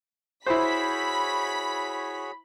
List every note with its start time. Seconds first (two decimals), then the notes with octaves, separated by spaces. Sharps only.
0.46 E4 F#4 G#4 C5 C#5 B5 B6